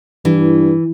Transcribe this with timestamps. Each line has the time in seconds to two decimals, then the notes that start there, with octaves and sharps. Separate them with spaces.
0.25 G2 E3